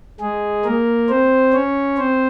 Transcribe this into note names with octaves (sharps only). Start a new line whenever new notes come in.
G#3 G#4
A#3 A#4
C4 C5
C#4 C#5
C4 C5